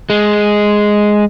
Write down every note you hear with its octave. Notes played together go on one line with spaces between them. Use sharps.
G#3